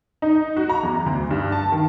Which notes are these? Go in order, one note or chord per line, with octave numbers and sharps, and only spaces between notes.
D#4
F#4
A#5
E2
D2
G2
A5
D#3